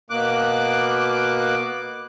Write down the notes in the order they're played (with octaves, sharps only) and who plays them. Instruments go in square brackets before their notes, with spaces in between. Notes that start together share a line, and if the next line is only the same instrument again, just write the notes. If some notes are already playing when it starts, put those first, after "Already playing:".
[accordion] B2 A#3 D6 F#6